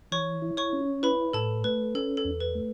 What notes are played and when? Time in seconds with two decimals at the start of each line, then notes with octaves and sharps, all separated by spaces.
0.12 E3 C#5 C#6
0.42 E4
0.57 C#5 C#6
0.73 C#4
1.03 E4 B4 B5
1.33 A2 A4 A5
1.64 A3 B4
1.95 C#4 A4
2.17 A4
2.25 E2
2.40 B4
2.55 A3